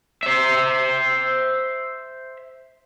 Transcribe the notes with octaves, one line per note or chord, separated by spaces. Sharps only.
C5 E5